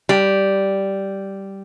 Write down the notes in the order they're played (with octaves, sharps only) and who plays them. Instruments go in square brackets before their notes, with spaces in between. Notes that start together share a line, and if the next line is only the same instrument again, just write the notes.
[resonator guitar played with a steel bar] G3